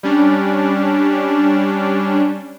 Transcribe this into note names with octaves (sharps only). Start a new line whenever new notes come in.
G3 C#4 D4